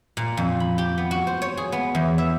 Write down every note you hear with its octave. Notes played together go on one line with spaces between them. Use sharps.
A#2
F2
B5
G4
B3
F#4
C5
C#5
G#4
B3
E2
E5